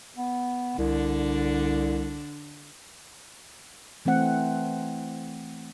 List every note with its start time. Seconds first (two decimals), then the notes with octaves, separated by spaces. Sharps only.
0.16 B3
0.78 C2 D3 D4
4.05 E3 A3 C4 F#5